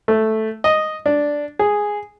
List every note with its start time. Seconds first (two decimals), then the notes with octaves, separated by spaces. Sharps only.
0.08 A3
0.64 D#5
1.06 D4
1.59 G#4